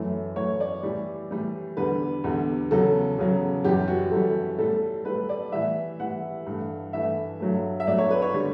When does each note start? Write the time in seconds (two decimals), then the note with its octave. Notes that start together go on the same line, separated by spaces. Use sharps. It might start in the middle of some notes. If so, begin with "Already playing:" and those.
Already playing: F#2 E3 A3
0.36 F#2 E3 A3 C#5
0.60 D5
0.83 A2 E3 G3
1.31 A2 E3 G3
1.77 E2 D3 G3 B4
2.24 E2 D3 G3
2.71 E2 C#3 F#3 A4
3.18 E2 C#3 F#3
3.64 F#2 E3 G3 G4
3.88 F#4
4.11 F#2 E3 G3 A4
4.58 A2 G3 A4
5.05 A2 G3 B4
5.29 D5
5.52 A2 E3 G3 E5
5.99 A2 E3 G3 F#5
6.46 G2 E3 A3
6.93 G2 E3 A3 E5
7.40 G2 F#3 A3
7.80 E5
7.87 G2 F#3 A3 D5
7.98 C#5
8.11 B4
8.22 C#5
8.34 D3 G3